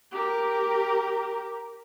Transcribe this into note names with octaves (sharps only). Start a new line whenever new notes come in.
G4 A#4